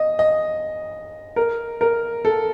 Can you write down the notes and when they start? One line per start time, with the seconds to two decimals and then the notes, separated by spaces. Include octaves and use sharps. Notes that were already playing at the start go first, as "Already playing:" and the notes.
Already playing: D#5
0.19 D#5
1.36 A#4
1.81 A#4
2.25 A4